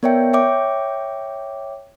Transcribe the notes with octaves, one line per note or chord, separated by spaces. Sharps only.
B3 A#4 C#5 D5 E5 G5
C#5 E5 G5 D6